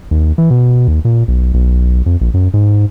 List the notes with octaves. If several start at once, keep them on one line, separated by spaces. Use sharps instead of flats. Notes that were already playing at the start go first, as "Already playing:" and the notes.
D#2
E3
B2
D#2
A#2
B1
B1
F2
A#1
F#2
G#2